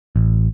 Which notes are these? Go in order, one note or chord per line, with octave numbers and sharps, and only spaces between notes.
A1